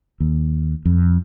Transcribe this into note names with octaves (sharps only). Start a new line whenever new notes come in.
D#2
F2